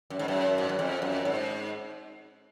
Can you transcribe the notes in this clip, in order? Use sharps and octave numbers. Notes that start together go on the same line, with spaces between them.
F#2
G#2
F#2
G#2
F#2
F2
F#2
G#2